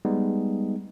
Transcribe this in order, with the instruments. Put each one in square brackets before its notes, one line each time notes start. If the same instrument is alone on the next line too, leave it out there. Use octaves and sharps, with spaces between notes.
[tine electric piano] G3 G#3 B3 D#4